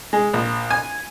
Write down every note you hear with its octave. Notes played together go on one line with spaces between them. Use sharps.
G#3
A#1
G#5